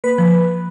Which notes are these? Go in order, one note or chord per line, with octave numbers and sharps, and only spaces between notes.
A#3 B4
F3